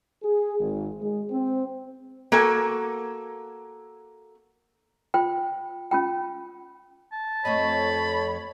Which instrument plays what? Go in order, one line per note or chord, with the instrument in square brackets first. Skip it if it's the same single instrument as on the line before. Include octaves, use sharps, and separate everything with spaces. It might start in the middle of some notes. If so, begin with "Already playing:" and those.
[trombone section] G#4
G#1
G#3
C4
[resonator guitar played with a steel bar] A#3 F#4 A4 G#5
[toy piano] F4 C5 G5
C#4 F4 G5
[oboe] A5
[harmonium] F2 C#5 [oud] A3 C4 D#5 [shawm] B5